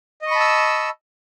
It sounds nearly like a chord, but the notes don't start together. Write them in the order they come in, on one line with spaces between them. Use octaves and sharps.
D#5 C#6 B5 A5 E6